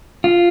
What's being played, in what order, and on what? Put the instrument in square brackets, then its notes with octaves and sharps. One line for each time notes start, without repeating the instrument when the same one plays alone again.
[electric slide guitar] F4